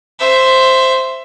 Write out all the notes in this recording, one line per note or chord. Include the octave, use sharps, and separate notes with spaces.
C5 E5